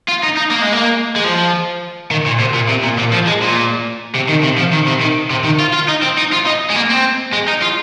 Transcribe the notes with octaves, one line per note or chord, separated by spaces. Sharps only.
F4
D#4
D#4
A#3
G#3
A#3
G#3
F3
D#3
A#2
C3
A#2
C3
A#2
A#2
F3
G#3
A#2
C3
D#3
C3
F3
D#3
C3
D#3
C3
D#3
F4
F4
D#4
C4
D#4
F4
D#4
G#3
A#3
C4
G#3
D#4
F4